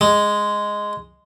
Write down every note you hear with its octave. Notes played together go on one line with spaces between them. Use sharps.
G#3